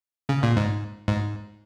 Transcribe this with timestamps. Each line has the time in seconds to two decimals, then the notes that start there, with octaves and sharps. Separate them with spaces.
0.29 C#3
0.43 A#2
0.57 G#2
1.08 G#2